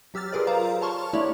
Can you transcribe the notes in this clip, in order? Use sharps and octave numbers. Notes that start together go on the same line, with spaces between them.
F#3 G4 E6 F6 A6
F4 G#4 A#4 B4 D5
C5 F5 A#5 A6
C#5 A5 C6 C#6 F6
A3 D4 E4 G4 C#5 D5